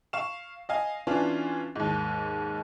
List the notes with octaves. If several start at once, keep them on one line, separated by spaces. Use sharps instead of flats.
F5 C#6 E7
D#5 F5 G#5
E3 B3 C#4 D4 F4
D#2 G#2